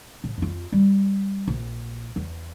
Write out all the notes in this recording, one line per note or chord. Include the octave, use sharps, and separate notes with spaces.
A2
F2 F4
G3
A#1
E2